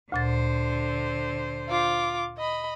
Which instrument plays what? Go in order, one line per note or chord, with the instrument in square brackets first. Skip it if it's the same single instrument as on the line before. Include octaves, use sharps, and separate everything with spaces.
[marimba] D2 A#2 A6 [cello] D3 C5
[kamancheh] F4 D6
D#5 B5